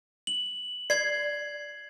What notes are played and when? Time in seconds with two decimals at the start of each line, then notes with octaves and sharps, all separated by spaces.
0.27 F#7
0.90 D5 G#6 C7